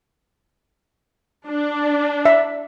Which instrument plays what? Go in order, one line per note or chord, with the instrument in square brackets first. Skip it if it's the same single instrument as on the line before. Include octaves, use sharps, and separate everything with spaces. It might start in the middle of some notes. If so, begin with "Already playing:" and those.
[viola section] D4
[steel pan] E5